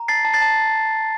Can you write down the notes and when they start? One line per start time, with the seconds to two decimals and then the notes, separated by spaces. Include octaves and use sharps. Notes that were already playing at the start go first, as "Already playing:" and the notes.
Already playing: A#5
0.08 A5 A6 C7
0.25 A5
0.33 A6 C7
0.41 A5